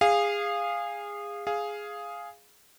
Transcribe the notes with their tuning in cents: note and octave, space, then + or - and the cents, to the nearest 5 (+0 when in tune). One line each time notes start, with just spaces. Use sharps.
G#4 -20 F5 +0
G#4 +0 F5 +0